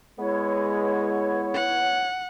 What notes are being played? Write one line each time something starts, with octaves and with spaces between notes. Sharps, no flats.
G#3 B3 E4 C#5
F#5